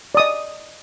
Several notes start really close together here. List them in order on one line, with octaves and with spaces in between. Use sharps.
D5 D#6 D#5